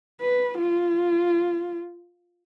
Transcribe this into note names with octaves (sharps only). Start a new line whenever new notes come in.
B4
F4